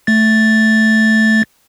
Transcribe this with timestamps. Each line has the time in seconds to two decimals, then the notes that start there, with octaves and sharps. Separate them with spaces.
0.07 A3 A6